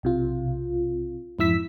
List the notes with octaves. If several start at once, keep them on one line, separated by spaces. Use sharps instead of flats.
B1 C3 F4
F2 G#2 E4 E6 B6